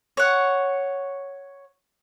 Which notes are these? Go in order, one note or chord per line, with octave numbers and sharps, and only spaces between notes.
C#5 F#5